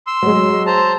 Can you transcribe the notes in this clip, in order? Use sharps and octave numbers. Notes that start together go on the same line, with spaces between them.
C6 E6
F#3 G#3
C5 A5 A#5